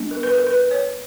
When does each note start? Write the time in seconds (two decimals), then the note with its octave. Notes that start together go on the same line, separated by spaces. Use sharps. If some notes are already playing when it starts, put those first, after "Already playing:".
Already playing: G3 B3 D4
0.11 A#4
0.23 B4
0.34 A#4
0.47 B4
0.71 C#5